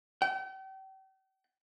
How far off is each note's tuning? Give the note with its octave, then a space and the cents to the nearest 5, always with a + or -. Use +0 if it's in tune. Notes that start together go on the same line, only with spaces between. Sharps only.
G5 -40